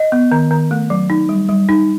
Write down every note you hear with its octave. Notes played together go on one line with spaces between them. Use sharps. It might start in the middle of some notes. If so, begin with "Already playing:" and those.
Already playing: D#5
B3
D#3
D#3
A3
F#3
D#4
G3
G3
D#4